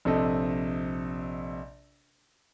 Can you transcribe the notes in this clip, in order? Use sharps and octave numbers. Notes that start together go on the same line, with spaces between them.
A#1 C3 A4 D#5